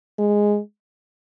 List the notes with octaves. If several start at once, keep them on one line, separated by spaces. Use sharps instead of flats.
G#3